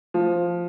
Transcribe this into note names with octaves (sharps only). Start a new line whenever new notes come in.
F3